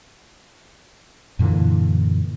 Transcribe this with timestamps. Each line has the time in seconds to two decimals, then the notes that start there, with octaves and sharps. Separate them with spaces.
1.39 F#2 A#2 D3 E3